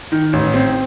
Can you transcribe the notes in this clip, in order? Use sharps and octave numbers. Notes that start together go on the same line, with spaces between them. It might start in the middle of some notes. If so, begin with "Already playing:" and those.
D#3
A1
C4